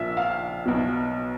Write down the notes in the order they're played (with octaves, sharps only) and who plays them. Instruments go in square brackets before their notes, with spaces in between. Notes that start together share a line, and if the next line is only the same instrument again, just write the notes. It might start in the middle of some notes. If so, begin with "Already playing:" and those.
Already playing: [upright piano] A#1 A#2 F3 E5
F5
B1 B2